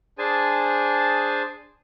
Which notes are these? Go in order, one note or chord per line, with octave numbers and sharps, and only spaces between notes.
D4 G#4 C5 G#5 A5